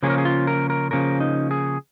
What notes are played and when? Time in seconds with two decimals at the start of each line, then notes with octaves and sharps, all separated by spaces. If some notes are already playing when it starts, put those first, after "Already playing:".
0.03 C#3 F3 A#3 C#4 G#4
0.10 A#4
0.18 G#4
0.25 F4
0.47 A#4
0.70 A#4
0.91 C#3 F3 A#3 C#4 A#4
1.20 D#4
1.51 G#4